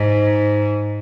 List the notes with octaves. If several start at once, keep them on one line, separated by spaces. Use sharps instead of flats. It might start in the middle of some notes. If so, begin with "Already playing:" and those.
Already playing: G#2